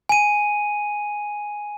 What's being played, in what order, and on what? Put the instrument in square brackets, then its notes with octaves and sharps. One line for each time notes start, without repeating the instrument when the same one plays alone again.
[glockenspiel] G#5 D#7